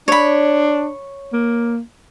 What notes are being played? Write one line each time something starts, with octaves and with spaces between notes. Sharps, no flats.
D4 C#5 B5
A#3